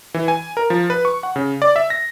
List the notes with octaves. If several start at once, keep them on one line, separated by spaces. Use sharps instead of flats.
E3
G#5
A#4
F3
B4
C#6
F#5
C#3
D5
E5
A#6